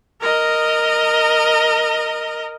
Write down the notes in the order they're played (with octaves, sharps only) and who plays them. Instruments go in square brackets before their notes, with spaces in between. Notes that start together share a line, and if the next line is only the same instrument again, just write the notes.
[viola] A#4 D#5